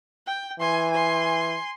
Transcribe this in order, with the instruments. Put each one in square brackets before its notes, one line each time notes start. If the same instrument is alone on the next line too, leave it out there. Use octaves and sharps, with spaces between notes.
[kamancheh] G5
[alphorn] E3 [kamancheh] G#5 C6
[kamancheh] G#5 C6